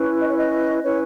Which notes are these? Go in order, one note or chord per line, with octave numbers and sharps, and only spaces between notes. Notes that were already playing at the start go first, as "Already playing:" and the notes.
Already playing: C#4 E4 B4
D#5
C#5
D#5
C#4 E4 B4 C#5